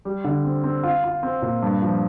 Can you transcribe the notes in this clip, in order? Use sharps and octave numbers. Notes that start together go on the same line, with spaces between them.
G3
D3
C4
C4
F4
F4
C4
A#2
G2
F3